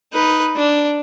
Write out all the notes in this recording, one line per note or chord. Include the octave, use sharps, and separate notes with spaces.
D#4 B4
D4